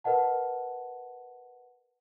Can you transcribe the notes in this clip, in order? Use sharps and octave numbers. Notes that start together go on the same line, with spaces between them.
A#4 B4 D#5 F#5 A5